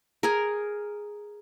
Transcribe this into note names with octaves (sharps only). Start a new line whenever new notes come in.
G#4 A#4